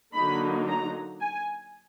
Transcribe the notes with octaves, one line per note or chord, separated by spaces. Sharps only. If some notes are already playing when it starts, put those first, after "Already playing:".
D3 F#3 A#3 D#4 B5
A#5
G#5